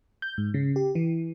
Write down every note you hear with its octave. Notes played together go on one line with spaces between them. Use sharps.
G6
G#2
C#3
G4
E3